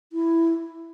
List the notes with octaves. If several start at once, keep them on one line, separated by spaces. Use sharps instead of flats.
E4